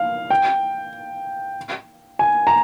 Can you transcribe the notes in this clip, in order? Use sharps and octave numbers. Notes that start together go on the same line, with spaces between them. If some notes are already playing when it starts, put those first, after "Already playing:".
Already playing: F5
G5
G#5
A#5